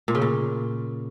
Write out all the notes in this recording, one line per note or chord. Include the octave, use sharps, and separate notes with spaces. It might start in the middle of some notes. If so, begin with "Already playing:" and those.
A#2
C#3
A#2